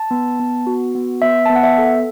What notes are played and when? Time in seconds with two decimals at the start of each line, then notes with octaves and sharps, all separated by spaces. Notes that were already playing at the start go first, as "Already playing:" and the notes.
Already playing: A5
0.11 B3
0.40 B3
0.67 F#4
0.95 B3
1.22 B3 E5
1.46 A5
1.50 B3
1.56 F#5
1.63 E5
1.78 A4